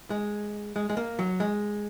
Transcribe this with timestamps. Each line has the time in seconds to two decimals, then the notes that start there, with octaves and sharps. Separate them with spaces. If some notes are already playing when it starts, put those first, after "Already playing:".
0.10 G#3
0.76 G#3
0.90 G#3
0.97 A#3
1.19 F#3
1.40 G#3